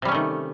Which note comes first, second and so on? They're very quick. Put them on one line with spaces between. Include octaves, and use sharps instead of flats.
C3 G3 C#4 A3 D#3